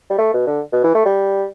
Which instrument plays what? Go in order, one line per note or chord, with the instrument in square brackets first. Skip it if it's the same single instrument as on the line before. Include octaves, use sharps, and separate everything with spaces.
[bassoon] G3
A3
B2
D3
B2
E3
A3
G3